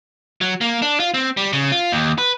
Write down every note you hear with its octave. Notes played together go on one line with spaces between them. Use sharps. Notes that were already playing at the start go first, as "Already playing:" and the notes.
F#3
A#3
D4
F4
C4
G3
C#3
F4
D#2
B4